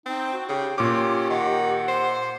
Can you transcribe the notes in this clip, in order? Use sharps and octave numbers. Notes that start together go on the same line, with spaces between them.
C4 D#4 G5
F#4
C#3 G4 G5
A#2 C#4 G4 C6 D6
D#3 F#5
C5